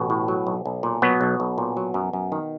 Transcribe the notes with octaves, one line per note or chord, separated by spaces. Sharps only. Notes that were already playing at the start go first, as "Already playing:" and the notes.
Already playing: A1 B2 B3
A2
F#3
B1
B1
A#2
B2 F#3 B3
B1
B1
A#2
F#3
F#2
F#2
D#3